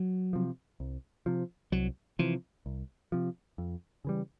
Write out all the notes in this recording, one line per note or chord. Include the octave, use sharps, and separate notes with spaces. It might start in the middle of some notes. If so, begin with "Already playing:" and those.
Already playing: F#3
C3 F3
C2
C3 F3
C2 F#3
C3 E3 F3
C2
C3 F3
F2
C#3 E3 G3